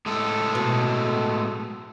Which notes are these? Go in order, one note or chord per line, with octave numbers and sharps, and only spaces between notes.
A2 G#3 A4
B2